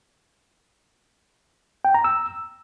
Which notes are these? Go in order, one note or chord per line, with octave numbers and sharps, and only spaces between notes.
G5
A#5
E6